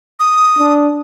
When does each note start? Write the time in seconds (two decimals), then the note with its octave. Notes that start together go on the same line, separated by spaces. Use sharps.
0.20 D#6
0.58 D4